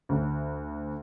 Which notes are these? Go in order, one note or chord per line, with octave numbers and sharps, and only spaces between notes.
D2